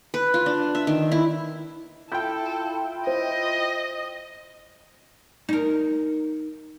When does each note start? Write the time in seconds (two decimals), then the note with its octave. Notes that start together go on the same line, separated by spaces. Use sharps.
0.14 B4
0.34 F4
0.46 D4
0.75 E5
0.87 D#3
1.12 E4
2.12 E4 F4 A4 G5 G6
3.07 C5 D#5
5.49 D#4 A#4